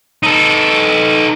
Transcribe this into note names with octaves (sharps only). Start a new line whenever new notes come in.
D#4 A4